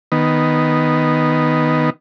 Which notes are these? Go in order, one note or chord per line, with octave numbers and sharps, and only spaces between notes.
D#3 B3